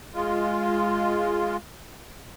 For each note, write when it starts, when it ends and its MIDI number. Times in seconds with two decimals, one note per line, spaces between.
0.14 1.57 56
0.14 1.57 65